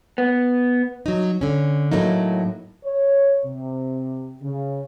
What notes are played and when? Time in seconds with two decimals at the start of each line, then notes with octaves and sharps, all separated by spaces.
0.18 B3
1.06 F#3 D#4
1.41 D3 C#4
1.92 A2 F#3 A3 A#3 D#4
2.84 C#5
3.45 C3
4.42 C#3